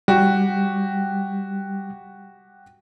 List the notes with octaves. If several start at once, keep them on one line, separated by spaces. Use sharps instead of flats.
G3 F#4 G4